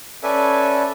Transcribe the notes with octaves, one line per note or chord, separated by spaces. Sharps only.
C#4 A4 B4 D5 E5 G#5